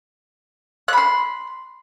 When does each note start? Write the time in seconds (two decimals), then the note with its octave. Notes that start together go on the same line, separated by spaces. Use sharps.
0.88 F#6
0.93 B5
0.97 C6